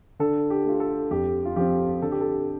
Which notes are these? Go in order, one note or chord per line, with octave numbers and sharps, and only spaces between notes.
D3 A4
G4
A3 F4
A4
F2 G4
F4
F3 C4 G4
D3 A4
G4
A4